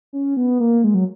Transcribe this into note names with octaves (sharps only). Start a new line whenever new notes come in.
C#4
B3
A#3
G#3
F#3